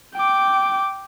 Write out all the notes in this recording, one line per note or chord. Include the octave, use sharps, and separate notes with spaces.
G5 D6